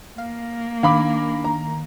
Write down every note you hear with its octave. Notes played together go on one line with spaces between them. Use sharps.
A#3 F5
D#3 D4 F5 B5 D6
A#5